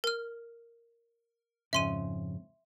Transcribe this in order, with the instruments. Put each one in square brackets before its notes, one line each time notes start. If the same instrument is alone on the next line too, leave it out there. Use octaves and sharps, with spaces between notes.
[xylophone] A#4 F6
[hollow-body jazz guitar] F2 G#2 C#3 [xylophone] E5 C6 D#7